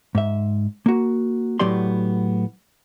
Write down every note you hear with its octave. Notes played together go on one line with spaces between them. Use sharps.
G#2 E5
A#3 F#4
A2 F#3 B3 G4 D5 C6